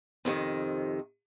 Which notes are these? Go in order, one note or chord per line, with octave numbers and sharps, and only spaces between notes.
F2 C3 D#3